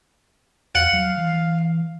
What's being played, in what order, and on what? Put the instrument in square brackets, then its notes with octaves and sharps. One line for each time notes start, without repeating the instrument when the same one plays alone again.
[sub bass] E2 [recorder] F5 [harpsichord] F#5
[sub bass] F#3
E3